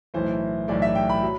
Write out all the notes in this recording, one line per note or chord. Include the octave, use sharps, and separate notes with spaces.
B1 A2 E3 A3 C5
B1 A2 E3 A3 D5
E5
G5
B5
F#3